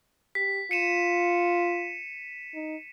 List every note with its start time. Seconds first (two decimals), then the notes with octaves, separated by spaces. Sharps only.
0.35 G4 B6
0.71 F4 C#7 D#7 E7
2.54 D#4